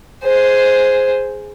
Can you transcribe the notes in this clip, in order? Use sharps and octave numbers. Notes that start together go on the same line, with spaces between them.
G#4 C5